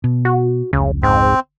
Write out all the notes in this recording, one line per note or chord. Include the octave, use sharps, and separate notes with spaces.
B2
F#4
F1 C#2 C#3
G#2 C4